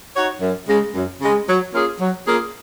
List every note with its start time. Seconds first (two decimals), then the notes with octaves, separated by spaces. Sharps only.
0.15 D#4 F#4 C#5
0.41 F#2
0.68 C#3 G#3
0.94 F#2
1.21 C#3 G#3
1.48 F#3
1.73 A#3 C#4 F4 G#4
2.00 F#3
2.26 A#3 C#4 F4 G#4